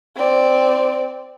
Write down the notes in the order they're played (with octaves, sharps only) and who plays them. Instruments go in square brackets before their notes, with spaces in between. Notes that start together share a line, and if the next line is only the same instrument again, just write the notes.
[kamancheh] C4 D5